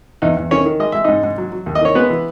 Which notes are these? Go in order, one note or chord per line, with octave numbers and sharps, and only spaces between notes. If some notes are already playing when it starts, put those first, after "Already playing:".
E2 D#4
E2
D#3 C#4 C#5
D#3
G#3 D#5
G#3 E5
G#2 D#4 D#5
G#2
F#3
F#3
D#2
D#5
D#3 C#5
G#3 B3 B4
E3